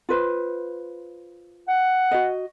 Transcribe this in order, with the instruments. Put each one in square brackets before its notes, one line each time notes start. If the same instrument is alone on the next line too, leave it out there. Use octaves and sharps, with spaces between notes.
[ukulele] F4 B4 C5
[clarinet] F#5
[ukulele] F#4 D#5